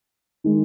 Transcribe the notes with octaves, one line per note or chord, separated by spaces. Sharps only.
D#3 G#3